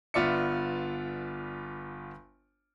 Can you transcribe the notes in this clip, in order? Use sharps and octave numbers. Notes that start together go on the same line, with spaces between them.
G1 B3 F4 D5 E5 C#7